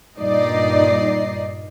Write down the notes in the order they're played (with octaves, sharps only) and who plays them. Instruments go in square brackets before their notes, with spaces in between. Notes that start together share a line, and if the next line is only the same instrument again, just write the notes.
[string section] G2 A#2 D#4 D5 D#5 C7